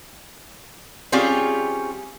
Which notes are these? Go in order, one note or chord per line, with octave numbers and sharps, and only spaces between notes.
G3 C4 C#4 F4 G4 G#4